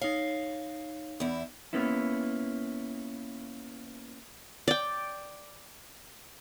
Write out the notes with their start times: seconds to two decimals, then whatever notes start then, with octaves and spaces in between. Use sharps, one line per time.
0.02 D#4 C#5 F5
1.20 E2 E4
1.73 A#3 B3 C#4 E4
4.68 D5 G5